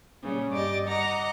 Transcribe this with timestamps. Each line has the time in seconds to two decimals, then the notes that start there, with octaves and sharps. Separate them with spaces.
0.23 A#2 C#3 G3
0.54 G2 G4 D5 D#5 A6
0.86 D#5 F#5 A#5 D6